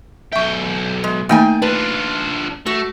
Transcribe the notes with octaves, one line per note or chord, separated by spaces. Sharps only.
B1 E5 G5 C#6
G#3
D#3 A3 A#3 D#4 G5 G#5
D4 F4 B4
A3 F#4